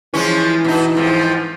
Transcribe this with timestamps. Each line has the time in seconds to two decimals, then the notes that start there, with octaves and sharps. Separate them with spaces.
0.14 E3 F3 G#3 C#4
0.65 B2 D#4
0.95 F2 G#2 F3